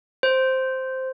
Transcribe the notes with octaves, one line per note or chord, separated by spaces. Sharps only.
C5